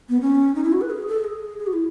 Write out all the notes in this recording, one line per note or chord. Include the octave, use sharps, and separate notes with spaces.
B3
C#4
D#4
E4
F#4
B4
G#4
A4
G#4
G#4
F#4
E4